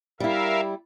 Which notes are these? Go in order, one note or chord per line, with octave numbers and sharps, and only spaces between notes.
G3 E4 A#4 E5 F5